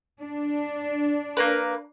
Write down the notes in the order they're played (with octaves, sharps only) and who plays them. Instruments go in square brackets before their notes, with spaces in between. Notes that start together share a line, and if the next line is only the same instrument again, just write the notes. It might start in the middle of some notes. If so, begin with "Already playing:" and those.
[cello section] D4
[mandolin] A#3 A#4 B4